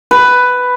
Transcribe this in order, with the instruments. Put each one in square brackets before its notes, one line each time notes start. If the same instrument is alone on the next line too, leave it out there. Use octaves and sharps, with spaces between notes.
[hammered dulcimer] B4